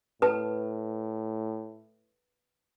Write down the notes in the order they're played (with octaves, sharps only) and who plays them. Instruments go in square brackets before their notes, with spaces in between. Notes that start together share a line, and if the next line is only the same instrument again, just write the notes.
[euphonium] A2 [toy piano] B4 A5